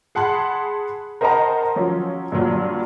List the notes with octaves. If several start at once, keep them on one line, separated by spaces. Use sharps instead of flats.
G#4 F#5 A5 B5 C6 F#6
A#4 C5 D#5 F#5 A5 A#5
F3 F#3 C#4
G2 A#2 F#3